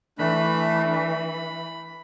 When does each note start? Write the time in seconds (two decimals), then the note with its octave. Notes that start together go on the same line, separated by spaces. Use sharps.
0.19 E3 A3 D4 B5
0.92 B5